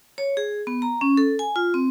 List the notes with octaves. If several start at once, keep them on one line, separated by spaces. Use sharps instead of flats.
C#5
G#4
B3
A#5
C#4
A4
G#5
F4
C4